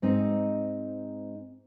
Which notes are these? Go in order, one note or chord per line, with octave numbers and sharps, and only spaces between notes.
G#2 C4 D#4